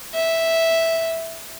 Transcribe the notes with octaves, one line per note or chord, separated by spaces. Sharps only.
E5